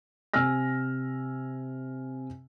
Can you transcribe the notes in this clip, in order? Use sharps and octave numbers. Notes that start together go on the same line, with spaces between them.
C3 G#5 E6 F6 A#6